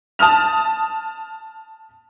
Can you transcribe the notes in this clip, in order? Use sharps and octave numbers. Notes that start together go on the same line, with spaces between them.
A5 D#6 F6 F7